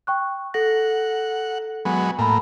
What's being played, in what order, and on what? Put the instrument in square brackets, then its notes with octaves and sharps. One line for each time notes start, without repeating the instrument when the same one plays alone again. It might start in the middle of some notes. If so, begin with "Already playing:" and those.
[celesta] G5 C#6 F#6
[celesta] A4 A#6 [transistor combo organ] F#5
[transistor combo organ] F#3 G#3 B3
[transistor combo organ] A2 A#3 [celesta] G#5 B5